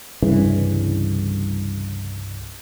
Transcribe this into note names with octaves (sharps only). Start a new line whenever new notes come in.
C2 G2 C#3 E3